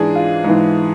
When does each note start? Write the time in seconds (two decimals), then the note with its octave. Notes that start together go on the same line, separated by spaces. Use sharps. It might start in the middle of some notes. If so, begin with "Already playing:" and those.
Already playing: G#2 E3 D4 G#4
0.16 F4
0.44 G#2 E3